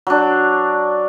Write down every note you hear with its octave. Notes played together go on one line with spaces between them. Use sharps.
F#3 D4